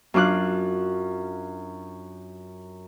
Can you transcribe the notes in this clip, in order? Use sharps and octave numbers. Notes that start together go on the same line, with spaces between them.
F#2 D4 F4 D6 F#6